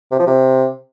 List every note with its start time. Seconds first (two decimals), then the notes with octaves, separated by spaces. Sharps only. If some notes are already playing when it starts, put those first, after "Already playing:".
0.12 C3
0.19 F3
0.27 C3